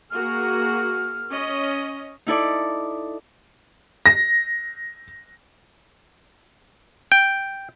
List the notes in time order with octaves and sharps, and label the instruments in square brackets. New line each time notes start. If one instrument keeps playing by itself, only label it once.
[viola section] A#3 F#4 G#4 [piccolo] F6
[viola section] C#4 D#5
[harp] D#4 E4 A4 D5
[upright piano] A#6
[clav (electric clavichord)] G5